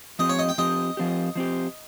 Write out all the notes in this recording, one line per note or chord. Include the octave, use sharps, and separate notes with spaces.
F3 C4 G4 D#5
C#5
D#5
G5
F3 C4 G4 D#5
F3 C4 G4
F3 C4 G4